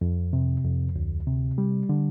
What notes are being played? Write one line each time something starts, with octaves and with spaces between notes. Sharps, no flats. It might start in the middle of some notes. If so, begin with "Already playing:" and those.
F2
C3
F2
D2
C3
G3
D3